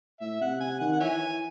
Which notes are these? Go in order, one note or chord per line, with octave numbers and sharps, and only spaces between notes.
A2 E5
C3 F#5
C3 G#5
D#3 F#5
F#5
E3 C#5 E5 G#5